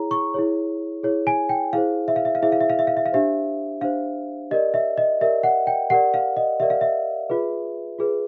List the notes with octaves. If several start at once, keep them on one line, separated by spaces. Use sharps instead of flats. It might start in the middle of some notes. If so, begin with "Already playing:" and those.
Already playing: E4 G#4 C#5 A#5
C#6
E4 G#4 C#5
E4 G#4 C#5
G#5
G5
E4 G#4 C5 F5
E5
F5
E5
F5
E4 G#4 C5 E5
F5
E5
F5
E5
F5
E5
F5
D4 G4 C5 E5
D4 G4 C5 F5
G4 A#4 D5 D#5
E5
D#5
G4 A#4 D5 E5
F#5
G5
G4 A#4 D5 F#5
F5
D#5
G4 A#4 D5 E5
F5
E5
F4 G#4 B4
F4 G#4 B4